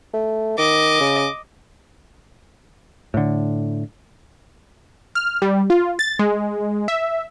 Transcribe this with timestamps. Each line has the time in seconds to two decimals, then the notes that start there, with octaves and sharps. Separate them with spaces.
0.13 A3
0.58 D#3 D#5 D6
1.00 C#3
3.14 A2 D3
5.15 F6
5.42 G3
5.70 F4
5.99 A6
6.19 G#3
6.88 E5